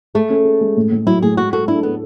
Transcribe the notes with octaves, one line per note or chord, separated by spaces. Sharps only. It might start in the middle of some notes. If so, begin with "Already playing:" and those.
A3 G#4
C#4
C#4
G#3
A2
A2
F#3 E4
A2 G#4
G#3 F#4
F#4 A4
D4 E4
B3 A4